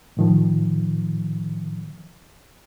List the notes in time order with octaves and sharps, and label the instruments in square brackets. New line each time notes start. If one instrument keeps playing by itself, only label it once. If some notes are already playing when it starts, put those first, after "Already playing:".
[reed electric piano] A2 D#3 F3